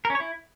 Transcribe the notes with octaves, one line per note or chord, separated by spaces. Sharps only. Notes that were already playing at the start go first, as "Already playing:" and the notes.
A#4
C#4
C#5
E4